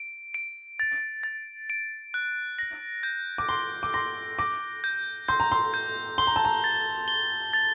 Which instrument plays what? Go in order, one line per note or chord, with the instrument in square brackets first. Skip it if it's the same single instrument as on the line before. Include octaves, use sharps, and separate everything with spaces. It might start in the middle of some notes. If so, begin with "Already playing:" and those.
Already playing: [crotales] D7
D7
A6
A6
D7
F#6
A#6
G6
[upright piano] D6
[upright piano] C6 [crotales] G7
[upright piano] D6
[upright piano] C6 [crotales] A#6
[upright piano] D6 [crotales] A#6
[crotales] G6
[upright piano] C6 [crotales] G6
[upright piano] A#5
C6
[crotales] G6
[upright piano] C6 [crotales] G7
[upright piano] A#5
A5
A#5
[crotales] A6
G7
A6